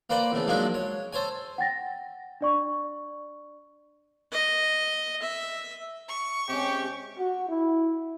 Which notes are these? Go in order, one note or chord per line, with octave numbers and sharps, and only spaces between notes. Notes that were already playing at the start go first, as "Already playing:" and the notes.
A#3 B4 C5 D5
E2 C#3 A3
F3 F#3 G#3 A#3 D4 D#4
C#5
A4 C5 C#5 G#5
F#5 G5 A6 A#6
D4 D5 C#6
D#5
E5
C#6
C3 G#3 C#4 G4
F#4
E4